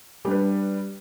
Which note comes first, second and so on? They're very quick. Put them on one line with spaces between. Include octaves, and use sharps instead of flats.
G3 D4 B4